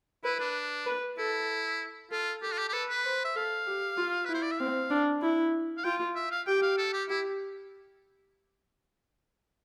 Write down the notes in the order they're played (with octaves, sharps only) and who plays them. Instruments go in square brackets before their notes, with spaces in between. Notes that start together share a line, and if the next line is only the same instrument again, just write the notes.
[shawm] E4 [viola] B4
[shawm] D4
[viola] B4
[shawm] E4 [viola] A4
[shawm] F4 [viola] A4
[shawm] G4 [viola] A4
[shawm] F4
G4
G4
[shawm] A4 [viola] B4
[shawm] B4
[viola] C5
[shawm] E5
[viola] A4 [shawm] F5
[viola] G4
F4
[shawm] B4
[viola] E4
[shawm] C5
D5
E5
[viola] C4 [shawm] F5
[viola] D4
E4
[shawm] F5
[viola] F4 [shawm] G5
[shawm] E5
F5
[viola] G4 [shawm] G5
[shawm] F5
A4
G4
[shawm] E4 [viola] G4